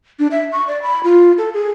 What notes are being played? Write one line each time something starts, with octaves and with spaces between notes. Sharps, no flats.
D4
E5
C#6
D5
B5
F4
A4
G#4